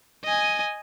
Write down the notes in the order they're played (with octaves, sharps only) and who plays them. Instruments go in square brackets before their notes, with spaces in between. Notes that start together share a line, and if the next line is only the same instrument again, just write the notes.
[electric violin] D#5 G#5